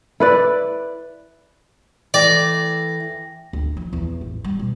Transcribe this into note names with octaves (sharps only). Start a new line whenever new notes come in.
E4 B4 D5
E3 A3 D5 G5 A#6
D2
F3
E2
A1
G3
B2